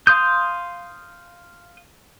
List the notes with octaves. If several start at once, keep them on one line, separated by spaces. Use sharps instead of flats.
F5 C6 D#6 G6